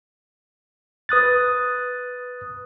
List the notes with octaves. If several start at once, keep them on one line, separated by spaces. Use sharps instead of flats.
B4 D#6 F#6 A6